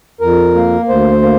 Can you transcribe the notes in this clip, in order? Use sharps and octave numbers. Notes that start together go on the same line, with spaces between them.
F2 A#4
A#3
D2 C5
A#3